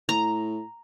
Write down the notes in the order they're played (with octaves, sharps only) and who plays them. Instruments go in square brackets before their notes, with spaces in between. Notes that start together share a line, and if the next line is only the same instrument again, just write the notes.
[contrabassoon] A2 [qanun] A#5